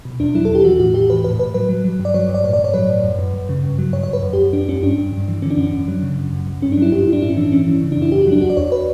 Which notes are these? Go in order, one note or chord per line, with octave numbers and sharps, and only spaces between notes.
B2
E2 D4
F#3 E4
A4
E2 G4
E3 F#4
A2 F#4
E3 G4
A2 B4
A2 B4
A2 B4
F#3 B4
F#3
F#3
G2
D5
F#3 C#5
G2
D5
A2 C#5
D5
A2
C#5
F#3 B4
A2
F#2
F#2
F#2
C#3
G2
F#3
G2 C#5
C#5
G2 B4
F#2
G4
F#2
F#2 D4
F#2 C#4
G2 D4
G2
G2
E3
D3 C#4
D4
F#2 C#4
F#2
F#3
C#3
F#2
F#2
F#2
G2 C#4
D4
F#3 E4
G2 G4
E4
G2
D4
A2 E4
C#4
E3 D4
E3 C#4
E3
C#3
D4
F#2 E4
F#2 G4
F#4
F#3 D4
E2 F#4
D5
E2 C#5
B4